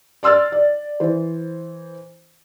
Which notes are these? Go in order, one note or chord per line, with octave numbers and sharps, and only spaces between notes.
D5 C6 E6 F6 A6
D5
E3 C5